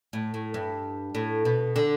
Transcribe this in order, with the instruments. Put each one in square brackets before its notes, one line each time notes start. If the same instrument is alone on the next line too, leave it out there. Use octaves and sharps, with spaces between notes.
[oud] A2
A2
G2
A2
B2
D3